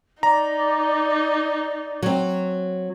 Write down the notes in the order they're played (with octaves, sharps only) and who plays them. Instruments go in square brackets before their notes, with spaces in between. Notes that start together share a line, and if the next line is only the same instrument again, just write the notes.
[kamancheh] D#4 [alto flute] D5 [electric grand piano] A#5
[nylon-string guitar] F#3 C4